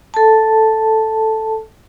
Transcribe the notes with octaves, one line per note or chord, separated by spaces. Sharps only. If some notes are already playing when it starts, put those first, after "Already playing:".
A4 A5